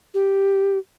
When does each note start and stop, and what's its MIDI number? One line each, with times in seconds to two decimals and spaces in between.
0.14 0.78 67